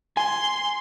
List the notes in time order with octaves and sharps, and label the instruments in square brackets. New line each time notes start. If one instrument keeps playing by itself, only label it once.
[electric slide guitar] G#5 [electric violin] C6